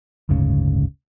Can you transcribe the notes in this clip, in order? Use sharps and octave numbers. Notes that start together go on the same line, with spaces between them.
F#1 D2 G#2 C#3